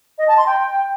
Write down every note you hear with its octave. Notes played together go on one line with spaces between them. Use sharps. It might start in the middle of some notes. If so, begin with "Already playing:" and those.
D#5
A5
C6
G5